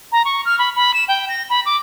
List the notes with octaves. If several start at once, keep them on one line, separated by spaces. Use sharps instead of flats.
A#5
C#6
F6
B5
B5
E7
G5
A#6
B5
D6